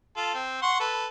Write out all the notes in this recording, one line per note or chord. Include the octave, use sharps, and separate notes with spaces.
F4 A4
C4
F#5 C6 C#6
A4 B4